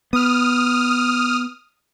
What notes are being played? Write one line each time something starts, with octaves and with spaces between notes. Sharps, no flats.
B3 D#6 F6